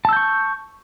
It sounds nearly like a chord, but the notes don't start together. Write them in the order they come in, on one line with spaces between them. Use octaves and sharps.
A5 E6 G6 C#6